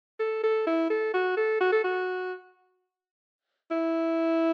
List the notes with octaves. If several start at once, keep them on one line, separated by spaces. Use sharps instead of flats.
A4
A4
E4
A4
F#4
A4
F#4
A4
F#4
E4